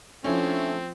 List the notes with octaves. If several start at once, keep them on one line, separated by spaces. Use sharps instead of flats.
D3 F3 A3 C4 C#4 E4